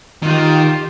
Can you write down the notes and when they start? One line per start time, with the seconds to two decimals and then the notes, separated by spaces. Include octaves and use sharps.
0.23 D#3 F4 G4